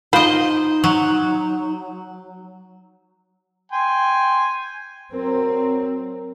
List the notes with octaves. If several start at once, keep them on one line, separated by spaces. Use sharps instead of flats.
D#4 F4 C5 D#5 B5
F#3
G5 G#5 C6
F#3 C4 A#4